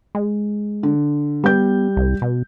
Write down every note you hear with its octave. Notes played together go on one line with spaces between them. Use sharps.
G#3
D3
G3 B3 G6
C2
B2